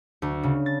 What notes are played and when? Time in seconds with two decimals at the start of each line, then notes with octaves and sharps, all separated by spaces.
0.22 D2
0.43 C#3
0.66 A6